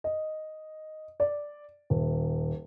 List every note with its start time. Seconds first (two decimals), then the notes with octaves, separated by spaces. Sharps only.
0.04 D#5
1.20 D5
1.90 D#1